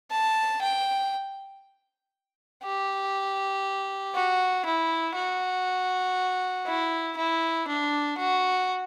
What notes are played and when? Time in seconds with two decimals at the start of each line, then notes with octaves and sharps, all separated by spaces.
0.11 A5
0.62 G5
2.64 G4
4.15 F#4
4.65 E4
5.15 F#4
6.66 E4
7.17 E4
7.68 D4
8.18 F#4